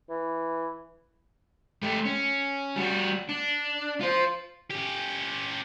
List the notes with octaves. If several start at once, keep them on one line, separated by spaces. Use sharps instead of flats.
E3
A3 G4
C#4
G3 F#4
D4
F4 C5
C#4 G4